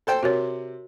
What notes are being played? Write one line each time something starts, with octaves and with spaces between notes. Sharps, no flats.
A4 C5 G5
C3 F#4 A#4 C#5